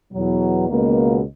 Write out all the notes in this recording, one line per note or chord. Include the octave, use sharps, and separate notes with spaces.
E2 B2 F#3
C#2 B2 A#3